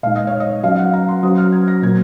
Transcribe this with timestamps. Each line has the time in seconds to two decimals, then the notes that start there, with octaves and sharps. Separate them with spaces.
0.03 A#2 G#3 D#4 F5
0.16 D#5
0.27 C#5
0.40 D#5
0.63 F#3 C#4 F#4 F5
0.78 F#5
0.93 A#5
1.08 C6
1.23 F#3 C#4 F#4 C5 D#6
1.37 F6
1.52 G#6
1.68 A#6
1.82 A#2 F#3 A#3 G#6